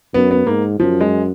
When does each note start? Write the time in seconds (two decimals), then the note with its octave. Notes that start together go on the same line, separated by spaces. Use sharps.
0.14 F#2 B3
0.31 B3
0.47 G#2 A#3
0.79 F#2 F3
1.00 G#3